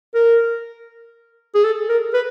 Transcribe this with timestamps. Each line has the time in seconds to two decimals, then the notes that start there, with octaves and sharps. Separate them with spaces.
0.15 A#4
1.54 G#4
1.64 A4
1.89 A#4
2.14 B4